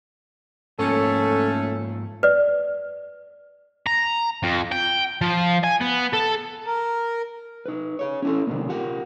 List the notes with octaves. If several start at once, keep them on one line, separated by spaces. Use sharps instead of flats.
G#2 F3 A3 A#3 C#4 A4
B4 D5
A#5
F2
G5
F3
G#5
B3
A4
A#4
D#4 B4
G#4 C#5
C#4 E4 A4
C3 D#3 E3 F#3 G3 A#3
F4 G4 A#4 F#5